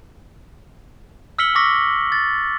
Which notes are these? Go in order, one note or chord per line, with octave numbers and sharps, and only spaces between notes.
E6 F6 B6 C#7 F#7 G7
C#6 D6 E6 A#6 B6
A6